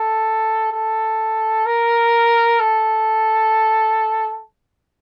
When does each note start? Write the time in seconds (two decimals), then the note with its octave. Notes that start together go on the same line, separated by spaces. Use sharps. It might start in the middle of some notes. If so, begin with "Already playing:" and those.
Already playing: A4
0.72 A4
1.66 A#4
2.60 A4